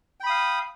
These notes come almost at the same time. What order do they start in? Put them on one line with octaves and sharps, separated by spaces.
G5 B5 D#6 F5